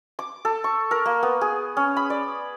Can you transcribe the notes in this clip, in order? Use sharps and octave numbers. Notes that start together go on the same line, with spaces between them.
D6
A4
C#6
A#4
A#3
B3
G#4
C#4
B5
D5